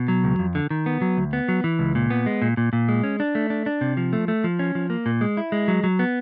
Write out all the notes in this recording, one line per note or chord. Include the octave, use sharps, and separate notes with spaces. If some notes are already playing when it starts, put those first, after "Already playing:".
Already playing: B2
F#3
C#2
F2
D3
D#3
B3
F#3
D2
B3
F#3
E3
C#2
A#2
B3
G#3
A#2
A#2
A#2
G#3
C#4
D4
A3
D4
D4
C3
F3
A3
A3
F3
C#4
F3
A#3
A#2
G#3
E4
G#3
F#3
F#3
B3